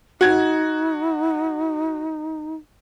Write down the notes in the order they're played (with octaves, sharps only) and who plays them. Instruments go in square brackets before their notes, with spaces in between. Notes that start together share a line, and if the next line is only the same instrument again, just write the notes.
[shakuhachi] D#4 [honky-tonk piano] F#4 G#6